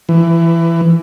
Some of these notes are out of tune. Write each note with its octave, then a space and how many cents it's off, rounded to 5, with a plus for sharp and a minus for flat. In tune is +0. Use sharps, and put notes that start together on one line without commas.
E3 +20